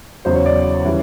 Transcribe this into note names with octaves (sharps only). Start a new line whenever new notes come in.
E2 C#3 F#3 C5
C#5
D5
C#3 E3 G3